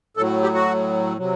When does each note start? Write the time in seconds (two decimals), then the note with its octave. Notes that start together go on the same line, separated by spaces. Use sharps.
0.17 A2 F#3 A4
0.43 G4
0.54 F#4
1.17 C3 F#3